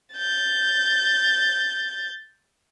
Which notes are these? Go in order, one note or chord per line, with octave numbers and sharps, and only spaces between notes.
G6 A6